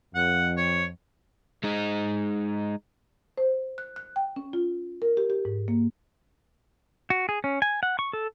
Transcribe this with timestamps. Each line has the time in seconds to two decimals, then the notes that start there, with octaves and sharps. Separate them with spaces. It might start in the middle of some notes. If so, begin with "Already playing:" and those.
0.15 F2 F#5
0.57 C#5
1.63 G#3 D#4
3.38 C5
3.78 F#6
3.96 F#6
4.16 G5
4.36 C#4
4.53 F4
5.02 A#4
5.17 G4
5.30 G4
5.45 G#2
5.68 A#3
7.10 F#4
7.29 G#4
7.44 C#4
7.62 G#5
7.83 F#5
7.99 C#6
8.13 A4